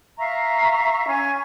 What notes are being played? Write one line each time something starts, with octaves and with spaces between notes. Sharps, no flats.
E5 F5 A#5 C#6
C#4 G#5 C#6